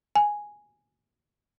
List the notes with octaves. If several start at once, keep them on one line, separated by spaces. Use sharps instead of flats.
G#5